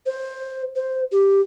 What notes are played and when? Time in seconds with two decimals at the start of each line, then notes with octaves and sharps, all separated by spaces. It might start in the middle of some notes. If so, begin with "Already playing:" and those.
0.06 C5
0.76 C5
1.12 G4